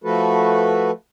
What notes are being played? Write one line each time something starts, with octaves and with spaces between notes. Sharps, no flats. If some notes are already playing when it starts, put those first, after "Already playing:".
F3 A3 F#4 A4 B4